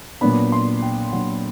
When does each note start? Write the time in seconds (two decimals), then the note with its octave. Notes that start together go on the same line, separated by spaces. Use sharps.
0.21 A#2 F#3 B3 D4 B5
0.52 C6
0.82 G5
1.12 A#2 F#3 B3 D4 F#5